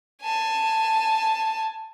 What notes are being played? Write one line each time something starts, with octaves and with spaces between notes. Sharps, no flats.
G#5 A5